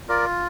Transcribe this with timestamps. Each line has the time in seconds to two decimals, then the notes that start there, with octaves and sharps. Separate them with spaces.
0.09 F4 A#4 D5